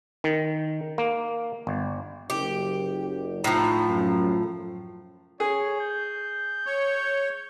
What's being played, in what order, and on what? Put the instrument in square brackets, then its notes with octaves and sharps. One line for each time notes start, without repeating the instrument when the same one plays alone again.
[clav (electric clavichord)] D#3
A#3
G1
[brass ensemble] F#1 [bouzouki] G4
[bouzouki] A2 F3 [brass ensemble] D#4 A#5
[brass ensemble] F#2
[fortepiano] G#4 [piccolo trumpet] C#5
[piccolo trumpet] G6
[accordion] C#5